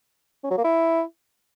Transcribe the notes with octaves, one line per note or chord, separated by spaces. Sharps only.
C#4
F#3
A#3
E4